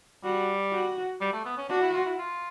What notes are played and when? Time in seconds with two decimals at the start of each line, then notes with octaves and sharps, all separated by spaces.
0.24 G3 F#4
0.72 F#4
1.21 G3
1.33 A3
1.45 B3
1.58 C#4
1.69 D4 F#4
1.82 E4
1.94 F4
2.06 E4
2.18 F4